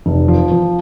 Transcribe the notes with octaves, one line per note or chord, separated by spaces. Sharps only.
F1
F3
F3